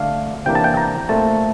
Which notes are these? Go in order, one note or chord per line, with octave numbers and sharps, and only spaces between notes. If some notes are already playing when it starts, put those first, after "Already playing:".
Already playing: D3 A3 D4 F5
C3 E3 A#3 D4 G5
A5
G5
A#5
A#2 A3 C4 A5